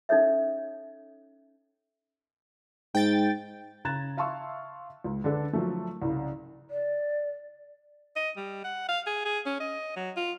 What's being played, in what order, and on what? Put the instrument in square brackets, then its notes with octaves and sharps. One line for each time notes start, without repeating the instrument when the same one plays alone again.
[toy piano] C#4 D#4 A4 C#5 E5
[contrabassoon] G#2 [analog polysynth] G5 A6
[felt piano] C#3 A#5 F#6 G#6 A6 E7
E5 F5 A5 C6 C#6 E6
C#2
D3 D4 A4 B4
F3 F#3 A3
C2 C#3
[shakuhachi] D5
[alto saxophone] D#5
G3
F#5
F5
G#4
G#4
C#4
D#5
F#3
F4